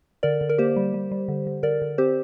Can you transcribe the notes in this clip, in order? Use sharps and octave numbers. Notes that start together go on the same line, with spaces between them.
D3 A#4 D5
D3
A#4
A#3 G4 C5
G3
G3
G3
D3
D3
D3 A#4 D5
D3
C4 G4 C5